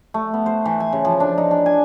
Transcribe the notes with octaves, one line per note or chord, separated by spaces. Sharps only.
A3
B3
C5
E3
G#5
C#3
F3
D4
D#4
D4
G#5